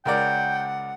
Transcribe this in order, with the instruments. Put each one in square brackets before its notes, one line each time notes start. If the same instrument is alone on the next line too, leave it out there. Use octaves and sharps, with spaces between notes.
[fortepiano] C#2 A#4 D5 [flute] F#5 [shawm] G5